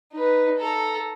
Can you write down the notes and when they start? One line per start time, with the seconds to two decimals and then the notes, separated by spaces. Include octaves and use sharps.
0.13 D#4 B4
0.57 A4 A#5